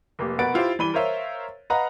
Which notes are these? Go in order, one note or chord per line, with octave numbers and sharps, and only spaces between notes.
F1 A#3 G4
B2 A#4 B4 F#5 A6 D7
E4 F4 G4 C5
E3 G3 B5 D#7 G7
A#4 C5 C#5 E5 F5
B4 D#5 F5 F#5 A#5